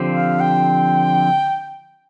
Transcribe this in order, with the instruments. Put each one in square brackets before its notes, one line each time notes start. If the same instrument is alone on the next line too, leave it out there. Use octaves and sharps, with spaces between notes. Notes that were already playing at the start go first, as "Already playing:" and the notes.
Already playing: [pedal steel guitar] D3 F3 C4 G4 C5
[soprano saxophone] F5
G5